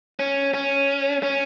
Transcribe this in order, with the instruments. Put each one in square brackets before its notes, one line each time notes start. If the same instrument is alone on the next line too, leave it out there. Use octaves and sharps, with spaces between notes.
[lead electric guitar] C#4
C#4
C#4